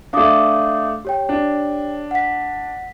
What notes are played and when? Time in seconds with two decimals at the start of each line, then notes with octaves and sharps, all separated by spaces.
0.13 A3 D4 F5 D6 D#6
1.05 G4 C#5 G5
1.29 D4
2.11 F#5 B6